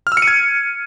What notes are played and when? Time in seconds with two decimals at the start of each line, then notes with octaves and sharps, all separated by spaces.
0.07 F6
0.12 E6
0.17 C#7
0.22 D#7
0.27 G#6